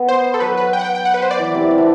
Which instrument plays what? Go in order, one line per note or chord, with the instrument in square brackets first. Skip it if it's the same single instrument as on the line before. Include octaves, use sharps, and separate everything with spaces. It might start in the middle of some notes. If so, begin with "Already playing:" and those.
Already playing: [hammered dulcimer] B3
[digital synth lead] C5
A4
[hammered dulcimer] F#3 [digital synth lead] B4
[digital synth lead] B4
G5
F#5
G5
G5
F#5
B4
C5
D5
[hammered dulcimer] E3
C3
C3
D3